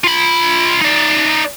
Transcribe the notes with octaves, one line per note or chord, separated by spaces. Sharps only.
F4 B5
D#4 D5